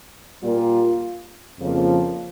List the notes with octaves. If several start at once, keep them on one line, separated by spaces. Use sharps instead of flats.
A#2 G3 A#3 F4
F2 C#3 F3 A#3